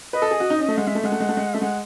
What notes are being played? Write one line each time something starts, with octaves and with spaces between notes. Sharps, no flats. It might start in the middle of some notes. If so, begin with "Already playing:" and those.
B4 D#5
A4
G#4
F#4
D#4
C#4
A3
G#3 F#5
G#3 E5
A3
G#3 F#5
A3
G#3
A3
G#3
A3 E5
G#3 F#5